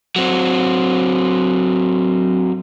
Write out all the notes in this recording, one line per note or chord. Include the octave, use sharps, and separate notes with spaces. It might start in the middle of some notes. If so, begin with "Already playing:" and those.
F#3 C4